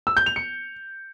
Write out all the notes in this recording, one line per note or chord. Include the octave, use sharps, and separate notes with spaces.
E6
G6
F7
C#7